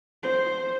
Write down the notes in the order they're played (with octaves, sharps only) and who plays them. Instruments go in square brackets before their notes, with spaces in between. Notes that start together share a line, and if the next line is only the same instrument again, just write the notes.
[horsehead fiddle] C5